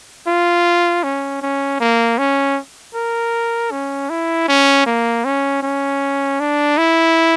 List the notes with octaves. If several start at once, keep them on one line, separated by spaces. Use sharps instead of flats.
F4
C#4
C#4
A#3
C#4
A#4
C#4
E4
C#4
A#3
C#4
C#4
D4
E4